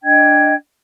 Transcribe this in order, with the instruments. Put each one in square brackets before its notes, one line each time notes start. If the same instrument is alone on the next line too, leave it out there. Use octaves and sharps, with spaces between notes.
[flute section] D4 D#5 G5 G#6